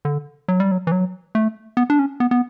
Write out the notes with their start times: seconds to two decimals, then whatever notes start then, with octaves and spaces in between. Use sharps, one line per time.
0.05 D3
0.48 F#3
0.60 G3
0.71 F#3
0.87 E3
0.92 F#3
1.35 A3
1.77 B3
1.90 D4
1.99 C#4
2.20 B3
2.31 B3